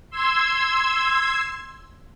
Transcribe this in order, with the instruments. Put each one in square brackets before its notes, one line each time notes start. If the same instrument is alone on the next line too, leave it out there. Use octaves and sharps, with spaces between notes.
[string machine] C6 E6 G#6